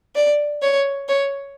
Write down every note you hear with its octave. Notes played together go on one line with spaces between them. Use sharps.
D5
C#5
C#5